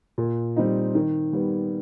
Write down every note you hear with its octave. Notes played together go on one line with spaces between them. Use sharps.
A#2
G3 C4 D#4
D#3
G3 B3